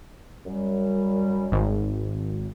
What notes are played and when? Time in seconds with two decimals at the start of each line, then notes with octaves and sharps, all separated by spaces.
0.46 F#2 G3
1.52 G#1